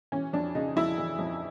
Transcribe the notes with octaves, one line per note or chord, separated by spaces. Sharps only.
E3 C#4
F2 D4
C#3 D#4
F2 E4
E3
F2